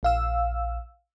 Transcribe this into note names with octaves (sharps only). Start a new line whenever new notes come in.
A#1 F5 E6